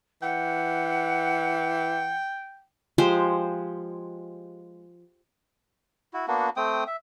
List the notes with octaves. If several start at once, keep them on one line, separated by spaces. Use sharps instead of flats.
E3 F#5 G5
F3 G#3 G4 C5
E4 F#4
A#3 B3 D4 F#4
A3 C4 G5 D#6
E5